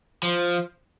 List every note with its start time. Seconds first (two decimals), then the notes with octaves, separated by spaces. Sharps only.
0.23 F3